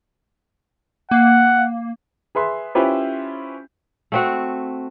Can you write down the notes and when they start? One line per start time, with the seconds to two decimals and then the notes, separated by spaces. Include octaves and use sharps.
1.11 A#3 F#5
2.35 G#4 B4 E5 C6
2.75 C#4 E4 F4 G4 B4 C5
4.12 A3 C4 F#4